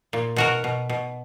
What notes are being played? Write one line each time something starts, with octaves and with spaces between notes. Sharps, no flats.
A#2
B2 F#4 A#4
B2
B2